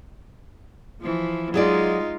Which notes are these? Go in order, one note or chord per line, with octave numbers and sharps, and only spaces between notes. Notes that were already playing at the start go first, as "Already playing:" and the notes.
E3 F3
F#3 G#3 D#4 F4 G#4 D5